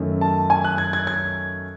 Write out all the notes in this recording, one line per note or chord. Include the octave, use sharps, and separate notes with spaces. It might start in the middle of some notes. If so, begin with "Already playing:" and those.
Already playing: F#2 D#3 A3 C#4
A5
G#5
F#6
G#6
G#6
G#6